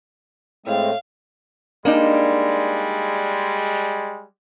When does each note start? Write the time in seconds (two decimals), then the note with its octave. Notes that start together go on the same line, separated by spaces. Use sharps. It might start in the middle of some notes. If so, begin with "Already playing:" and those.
0.66 A2 G#3 A3 C4 F5
1.85 G3 G#3 A#3 D4 D#4